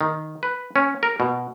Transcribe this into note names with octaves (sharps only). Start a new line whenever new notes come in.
D#3
B4
C#4
A#4
B2